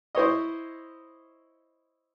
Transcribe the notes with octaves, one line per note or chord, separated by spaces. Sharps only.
E4 C5 C#5 D#5